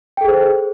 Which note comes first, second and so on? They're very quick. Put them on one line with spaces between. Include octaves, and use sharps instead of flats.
G5 A4 G#4 C5